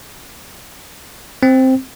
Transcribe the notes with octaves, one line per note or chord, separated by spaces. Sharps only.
C4